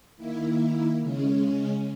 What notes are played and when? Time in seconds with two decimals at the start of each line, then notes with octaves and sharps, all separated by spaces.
0.17 D#3 A#3 E4
1.02 C#3 G#3 C#4